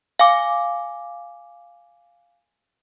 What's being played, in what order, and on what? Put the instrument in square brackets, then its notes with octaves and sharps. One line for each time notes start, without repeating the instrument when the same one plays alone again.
[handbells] F5 G#5 D6